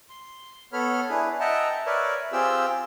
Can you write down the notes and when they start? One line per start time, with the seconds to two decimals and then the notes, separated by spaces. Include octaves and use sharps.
0.09 C6
0.73 B3 A4 C#5 B5 F6
1.10 D4 E4 G#4 B4
1.40 D#5 E5 F#5 G5 A5 A#5
1.86 A#4 B4 C#5 D5 E5
2.32 C4 F4 G4 G#4 G5 E6